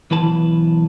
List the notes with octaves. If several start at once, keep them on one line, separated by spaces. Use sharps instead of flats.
B1 E3 B4 A5